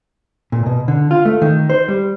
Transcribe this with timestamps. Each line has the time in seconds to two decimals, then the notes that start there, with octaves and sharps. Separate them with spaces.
0.52 A#2
0.66 B2
0.88 D3
1.11 F4
1.25 A3
1.42 D#3
1.70 C5
1.88 G3